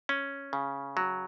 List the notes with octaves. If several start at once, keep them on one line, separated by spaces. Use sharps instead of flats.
C#4
C#3
F#3